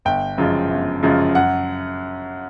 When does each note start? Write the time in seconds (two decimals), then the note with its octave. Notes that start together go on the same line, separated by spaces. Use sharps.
0.05 G1 G5
0.38 F#2 C#3 F3 G#3
0.70 G1
1.03 F#2 C#3 F3 G#3
1.35 F#2 F#5